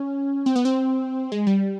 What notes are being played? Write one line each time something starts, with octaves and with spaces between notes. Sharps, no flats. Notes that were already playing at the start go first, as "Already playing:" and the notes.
Already playing: C#4
C4
B3
C4
G#3
G3